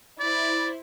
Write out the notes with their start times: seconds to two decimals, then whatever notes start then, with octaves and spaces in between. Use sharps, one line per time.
0.20 E4 C5 D5